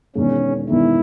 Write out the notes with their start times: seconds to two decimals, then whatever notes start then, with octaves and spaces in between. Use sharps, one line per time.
0.15 E1 E2 D#3 C#4
0.69 E1 E2 D#3 E4